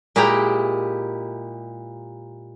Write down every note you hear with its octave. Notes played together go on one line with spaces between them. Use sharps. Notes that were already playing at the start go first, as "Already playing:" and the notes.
A#2 G#3 E4 G4 G5 A#5